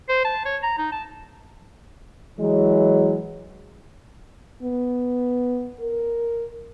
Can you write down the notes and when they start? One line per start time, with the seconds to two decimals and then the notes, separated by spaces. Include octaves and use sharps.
0.09 C5
0.25 A5
0.46 C#5
0.63 A#5
0.78 D#4
0.92 A5
2.39 E3 F#3 G#3
4.63 B3
5.81 A#4